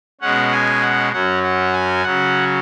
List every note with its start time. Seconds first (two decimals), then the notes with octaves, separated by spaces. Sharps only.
0.21 B2 G#3 C#4 F#5
0.52 G#5
0.82 F#5
1.13 F#2 F#3 C#4 F#5
1.43 F#5
1.73 G#5
2.03 C#3 F#3 C#4 F#5